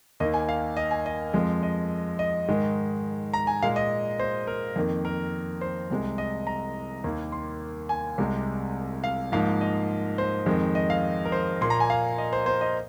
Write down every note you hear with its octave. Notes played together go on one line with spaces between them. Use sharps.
D#2 D#3 A#3 D#5
G#5
F5
D#5
G#5
D#5
F2 F3 G#3
D#5
D#5
G#2 D#3 G#3
A#5
G#5
A#2 G#3 F5
D#5
C5
A#4
F2 D#3 A#3
A#4
C5
C2 C3 G#3
D#5
A#5
D#2 D#3 A#3
C6
G#5
C2 C3 G#3
F5
G#2 F3 A#3 F5
D#5
C5
F2 D#3 G#3
D#5
F5
A#4
C5
A#2 A#3 C6
A#5
G#5
F5
D#5
C5
C5
D#5